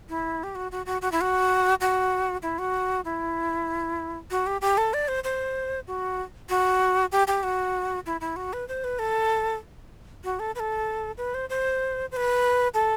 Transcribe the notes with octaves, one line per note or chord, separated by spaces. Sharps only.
E4
G4
F#4
F#4
F#4
F#4
E4
F#4
F#4
E4
F#4
E4
F#4
G4
G4
A4
D5
C5
C5
F#4
F#4
G4
G4
F#4
E4
E4
F#4
B4
C5
B4
A4
F#4
A4
B4
A4
B4
C5
C5
C5
B4
A4